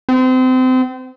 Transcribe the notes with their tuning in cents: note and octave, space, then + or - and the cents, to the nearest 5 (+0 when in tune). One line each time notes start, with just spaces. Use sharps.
C4 -30